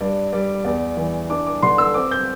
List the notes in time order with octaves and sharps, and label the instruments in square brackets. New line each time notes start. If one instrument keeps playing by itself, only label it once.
[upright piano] G2 D5
G3 D5
E2 D5
E3
D4 D6
D6
D3 C6
E6
C4 D6
G6